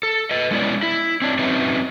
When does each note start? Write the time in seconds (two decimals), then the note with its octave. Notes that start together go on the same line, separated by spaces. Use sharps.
0.03 A4
0.31 B4 D#5
0.51 G#3 B3 C#4 E4 B4 D5
0.83 E4
1.22 C4 D4 E4
1.39 F#3 C4 C#4 D#4 B4 E5